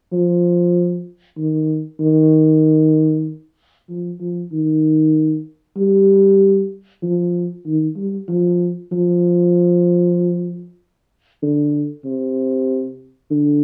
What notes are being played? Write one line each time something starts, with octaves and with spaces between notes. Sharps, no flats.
F3
D#3
D#3
F3
F3
D#3
G3
F3
D#3
G3
F3
F3
D3
C3
D3